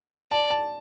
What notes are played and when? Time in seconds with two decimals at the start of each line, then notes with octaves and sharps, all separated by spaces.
0.31 D5 A5
0.50 A5